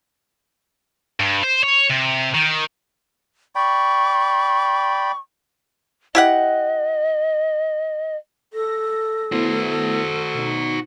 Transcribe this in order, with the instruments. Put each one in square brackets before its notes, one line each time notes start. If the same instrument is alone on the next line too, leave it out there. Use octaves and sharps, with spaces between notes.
[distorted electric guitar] G2
C5
C#5
C3
D#3
[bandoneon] D5 G5 B5 [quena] C#6
[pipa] E4 G4 F#5 [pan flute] D#5
[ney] A4 [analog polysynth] A#6
[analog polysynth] A3 B3 E4 [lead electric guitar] F#4 C5
[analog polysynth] B2 D#4